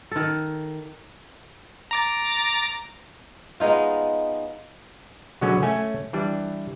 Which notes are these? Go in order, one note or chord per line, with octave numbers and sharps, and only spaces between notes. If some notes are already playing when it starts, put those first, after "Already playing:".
D#3 A4
A#5 D6 A6
G#3 B3 D#4 F4
B2 D3 F#3 G#3 B3 C#4
A3 C#4 G#5
E3 G3 D4